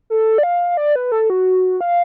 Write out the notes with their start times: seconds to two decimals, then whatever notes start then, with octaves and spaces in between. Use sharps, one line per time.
0.10 A4
0.38 D5
0.43 F5
0.77 D5
0.96 B4
1.12 A4
1.30 F#4
1.81 F5